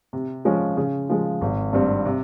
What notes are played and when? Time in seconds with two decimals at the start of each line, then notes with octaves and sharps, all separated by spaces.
0.13 C3
0.45 F3 G#3 C#4
0.77 C#3
1.10 F3 G#3
1.41 G#1
1.73 G2 G3 C4
2.05 C3